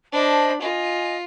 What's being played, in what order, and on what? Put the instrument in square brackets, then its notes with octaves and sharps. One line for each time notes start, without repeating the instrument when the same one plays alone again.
[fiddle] D4 B5 [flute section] C5 D#5 A5
[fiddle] F4 [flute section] D#5 G#5